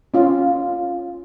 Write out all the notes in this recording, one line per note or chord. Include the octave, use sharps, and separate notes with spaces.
C#4 F4